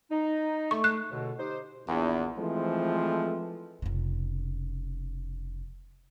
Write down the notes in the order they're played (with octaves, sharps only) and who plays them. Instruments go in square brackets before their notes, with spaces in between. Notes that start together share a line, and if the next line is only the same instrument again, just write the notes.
[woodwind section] D#4
[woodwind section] A3 [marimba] C#6
[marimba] F#6
[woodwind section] C#2 B2 D3
D#4 G4 C5
[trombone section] A#1 E2
E3 F3 G#3 A3 C4
[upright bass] F1 C#3